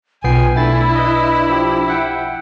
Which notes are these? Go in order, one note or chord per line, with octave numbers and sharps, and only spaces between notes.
B1 B3 F4 G5 G#5 C7
A3 D4 E4 A6
B4 D#5
F3 G4
E5 F#5 G5